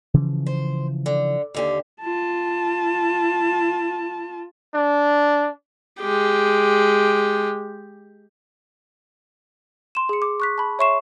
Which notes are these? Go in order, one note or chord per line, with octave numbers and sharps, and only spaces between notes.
C#3 E3 F3
C5
D3
D#2 D3 G4
F4 A5
D4
G#3 G4
C6 E7
G#4 C#7
D6
C#6 F#6 B6
A5 B5
C#5 E5 C6 C#6 C7 E7